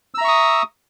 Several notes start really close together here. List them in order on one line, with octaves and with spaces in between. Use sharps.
E6 A#5 E5 C#6 D#6